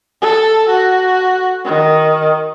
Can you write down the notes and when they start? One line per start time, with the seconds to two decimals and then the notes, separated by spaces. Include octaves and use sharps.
0.21 A4
0.69 F#4
1.65 D#3